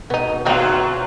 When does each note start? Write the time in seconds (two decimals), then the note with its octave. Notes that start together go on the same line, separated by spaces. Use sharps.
0.10 B2 B3 D#4 D#7
0.45 E2 D#3 F#3 A#3 C4 F4